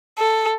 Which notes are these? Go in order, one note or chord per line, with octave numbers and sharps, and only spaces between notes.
A4